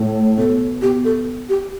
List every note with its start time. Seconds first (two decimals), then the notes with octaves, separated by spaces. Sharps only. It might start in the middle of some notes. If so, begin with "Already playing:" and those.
Already playing: A2
0.37 B2 A4
0.82 B2 G4
1.05 A4
1.49 G4